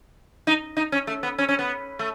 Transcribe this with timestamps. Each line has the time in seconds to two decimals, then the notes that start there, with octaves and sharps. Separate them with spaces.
0.47 D#4
0.77 D#4
0.92 C#4
1.07 A3
1.23 B3
1.38 C#4
1.49 C#4
1.59 B3
1.99 A3